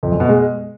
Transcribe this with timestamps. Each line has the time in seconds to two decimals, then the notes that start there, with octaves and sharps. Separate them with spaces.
0.03 F2
0.11 F#2
0.20 B2
0.29 G#3